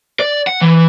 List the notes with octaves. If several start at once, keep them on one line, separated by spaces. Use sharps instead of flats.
D5
F#5
E3